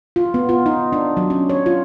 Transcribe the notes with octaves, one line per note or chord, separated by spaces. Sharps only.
F4
B3
F4
D#4
D4
F#3
C#4
C#5
F4